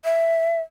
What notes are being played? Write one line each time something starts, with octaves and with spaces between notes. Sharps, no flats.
E5